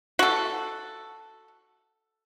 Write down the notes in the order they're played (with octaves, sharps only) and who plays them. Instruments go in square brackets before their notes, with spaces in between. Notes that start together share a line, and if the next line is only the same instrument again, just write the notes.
[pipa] F#4 A4